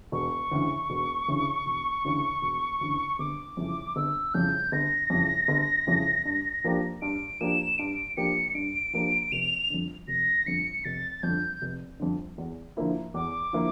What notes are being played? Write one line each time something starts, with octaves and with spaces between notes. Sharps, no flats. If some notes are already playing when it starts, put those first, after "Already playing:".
E1 C#6
D2 C#3 E3
E1
D2 C#3 E3
E1
D2 C#3 E3
E1
D2 C#3 E3
G1 D6
F2 C#3 E3
G1 E6
F2 C#3 E3 G6
G1 A#6
F2 C#3 E3
G1
F2 C#3 E3
G2
F3 A#3 D4 G4
G2 D7
F3 A#3 D4 G4 E7
G2 D7
F3 A#3 D4 G4 C#7
G2 D7
F3 A#3 D4 G4
F1 F7
F2 D3
F1 A#6
F2 D3 C#7
F1 A6
F2 D3 G6
F1
F2 D3
E2
D3 F3 A#3 E4
E2 D6
D3 F3 A#3 E4